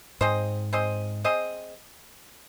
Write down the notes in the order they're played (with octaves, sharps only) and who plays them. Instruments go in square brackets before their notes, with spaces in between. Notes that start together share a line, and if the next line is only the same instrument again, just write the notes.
[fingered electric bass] G#2 [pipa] C4 G#4 C5 D#5
[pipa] C4 G#4 C5 D#5
C4 G#4 C5 D#5